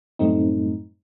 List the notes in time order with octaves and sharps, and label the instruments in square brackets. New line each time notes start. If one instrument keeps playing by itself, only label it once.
[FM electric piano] F#2 A2 G3 A3 C4 D#4